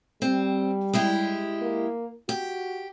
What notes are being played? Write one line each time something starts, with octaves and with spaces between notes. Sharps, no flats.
G3 C4
G#3 E4 G4
A#3
F#4 G4